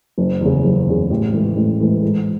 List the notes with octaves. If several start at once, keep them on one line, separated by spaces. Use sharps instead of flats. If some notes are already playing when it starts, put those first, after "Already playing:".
F#1
E2 C#3
F#1
E2 C#3
A1
G#2 E3 A3
A1
G#2 E3 A3
G#2